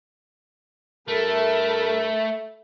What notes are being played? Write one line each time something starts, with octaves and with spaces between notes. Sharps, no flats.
G2 A3 A4 A#4 E5 B5